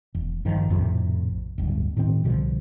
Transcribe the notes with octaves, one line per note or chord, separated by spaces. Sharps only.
E1
G#1 G2 D#3 F3
A#1 F2 A2 C3
D1 G1
A2 D#3 C4
C2 B2 D3 F3